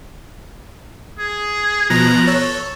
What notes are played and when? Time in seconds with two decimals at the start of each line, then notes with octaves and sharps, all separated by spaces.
1.19 G#4
1.90 B2 F3 A#5 F#6
2.27 A4 C#5